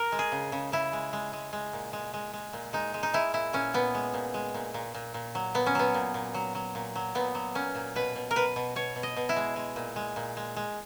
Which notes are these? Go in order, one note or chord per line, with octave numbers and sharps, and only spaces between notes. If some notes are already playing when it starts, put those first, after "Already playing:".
Already playing: A#4
G#3
G#4
C#3
C#3
C#3 E4
G#3
G#3
G#3
G#3
A#2
G#3
G#3
G#3
A#2
G#3 D#4
G#3
D#4
G#3 E4
A#2 E4
A#2 C#4
A#2 B3
G#3
A#2
G#3
A#2
A#2
A#2
A#2
F#3
A#2 B3
C#4
F#3 B3
A#2
A#2
F#3
F#3
A#2
F#3
A#2 B3
F#3
A#2 C#4
A#2
B2 B4
B2
A#4
B2 B4
B2
B2 C#5
B2
D#5
B2
E4
G#3
G#3
A#2
G#3
A#2
G#3
G#3